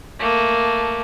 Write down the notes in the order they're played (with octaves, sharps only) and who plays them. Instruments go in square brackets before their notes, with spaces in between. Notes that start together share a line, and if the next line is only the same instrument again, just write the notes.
[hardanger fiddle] A3 A#3